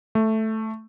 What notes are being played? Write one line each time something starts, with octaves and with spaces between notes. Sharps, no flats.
A3